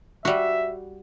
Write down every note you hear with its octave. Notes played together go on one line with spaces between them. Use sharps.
G3 F#4 E5